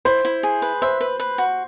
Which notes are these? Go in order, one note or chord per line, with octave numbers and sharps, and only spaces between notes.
E4 C5
E4
G#4
B4
C5 E5
B4
B4
F#4